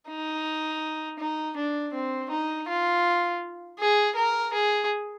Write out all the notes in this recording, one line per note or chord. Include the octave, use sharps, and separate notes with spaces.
D#4
D#4
D4
C4
D#4
F4
G#4
A#4
G#4